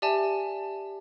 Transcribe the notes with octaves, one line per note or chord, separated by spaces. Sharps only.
G4 D5 E5 G#5 A5